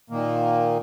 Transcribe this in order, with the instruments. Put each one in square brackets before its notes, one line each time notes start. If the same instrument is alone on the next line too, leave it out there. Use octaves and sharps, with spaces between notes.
[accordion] A#2 D#3 A#3